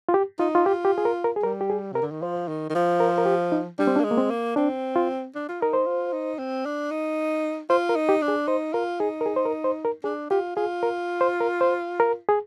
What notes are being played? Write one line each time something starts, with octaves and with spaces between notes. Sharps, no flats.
F4
G4
D#4 F4
F4
F4 G4
G4
G#4
A#4
A#4
G#4
G3 A#4
G4
G#4
C3 A#4
D3
D#3
F3 C5
D#3
D#3
F3
A#4
C5
A#4
G4
D#4
G3 D4
C4
D4
A#3
G#3
A#3
C4
A#3
C4 D4
F4
D4
F4
D#4 A#4
C5
F4
D#4
C4
D4
D#4
F4 C5
A#4
D#4
G4
D4
G#4
D#4 C5
F4 A#4
D#4 G#4
A#4
G#4
C5
A#4
C5
A#4
D4 G#4
F4 G4
F4 G#4
A#4
C5
A#4
C5
A#4
G#4